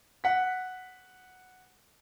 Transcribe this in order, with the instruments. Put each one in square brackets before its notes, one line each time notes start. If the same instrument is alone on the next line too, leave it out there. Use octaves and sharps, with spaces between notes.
[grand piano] F#5 B6